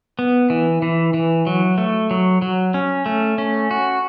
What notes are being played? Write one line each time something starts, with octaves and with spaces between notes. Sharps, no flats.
B3
E3
E3
E3
F#3
A3
F#3
F#3
C#4
A3
C#4
F#4